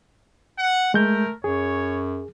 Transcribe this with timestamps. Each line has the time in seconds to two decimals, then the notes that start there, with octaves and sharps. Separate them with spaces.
0.58 F#5
0.94 G#3 A3 A#4 G6
1.44 F#2 G#4 C#5